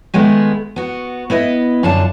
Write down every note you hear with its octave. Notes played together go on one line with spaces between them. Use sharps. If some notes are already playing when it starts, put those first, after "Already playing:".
D#3 G#3 A3 B3
B3 F#4
B3 E4 B4 D#5
F#2 D3 D4 F4 A5